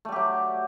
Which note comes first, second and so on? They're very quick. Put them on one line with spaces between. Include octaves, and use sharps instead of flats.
A3 G3 G4 F#3